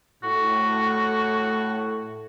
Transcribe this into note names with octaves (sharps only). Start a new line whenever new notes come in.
A2 F#4